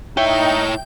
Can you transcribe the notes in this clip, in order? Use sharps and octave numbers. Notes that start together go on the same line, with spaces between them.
D#4 E4 C#5 E5 G5